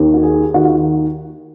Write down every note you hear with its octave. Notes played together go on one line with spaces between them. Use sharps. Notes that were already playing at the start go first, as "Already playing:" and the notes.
Already playing: D#2 D#3
F#4
G#4
D#2 D#3 F#4
F4